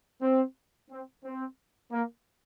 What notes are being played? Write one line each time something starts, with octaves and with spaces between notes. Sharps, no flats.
C4
C4
C4
A#3